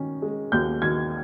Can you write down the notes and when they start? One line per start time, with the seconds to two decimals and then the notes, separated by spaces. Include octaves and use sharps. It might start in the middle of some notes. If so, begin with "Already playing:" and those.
Already playing: D#3 C#4
0.22 G#3
0.52 D#2 G6
0.82 D#3 G#6